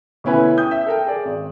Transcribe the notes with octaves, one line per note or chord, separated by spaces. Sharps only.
D2 B2 C#4 E4 B4 G#5
G5 D#6 G6
E5
A4 A#4 G5
G#4 D5
G#1